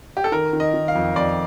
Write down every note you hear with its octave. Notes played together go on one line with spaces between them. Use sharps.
G4
A4
D#3 A#4
D#3
D#5
D#3
F5
F2
F2 D5